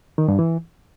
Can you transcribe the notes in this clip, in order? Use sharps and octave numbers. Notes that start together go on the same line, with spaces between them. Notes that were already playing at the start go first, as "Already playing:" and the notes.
D#3
G2
E3